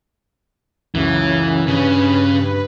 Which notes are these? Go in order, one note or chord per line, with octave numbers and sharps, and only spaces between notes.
C#2 F#2 C#3 E3
G2 C#3 C#4 B4